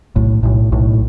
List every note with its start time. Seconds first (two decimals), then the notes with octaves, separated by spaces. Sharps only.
0.16 B1 A2
0.43 B1 A2
0.72 B1 A2